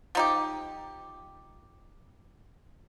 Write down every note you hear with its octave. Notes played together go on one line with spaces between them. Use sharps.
F3 D#4 G4